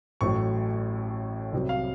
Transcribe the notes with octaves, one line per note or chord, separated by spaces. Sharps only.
A1 A2 F#3 A3 C#6
C2 C3 F#3
F5